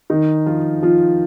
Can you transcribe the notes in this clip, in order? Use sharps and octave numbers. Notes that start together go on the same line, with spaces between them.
D#3 D#4
F3 F4
F3 F4